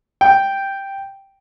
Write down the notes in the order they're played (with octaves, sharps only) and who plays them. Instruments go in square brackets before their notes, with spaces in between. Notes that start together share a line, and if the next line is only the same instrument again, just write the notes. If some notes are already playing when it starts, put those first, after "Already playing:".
[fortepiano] G5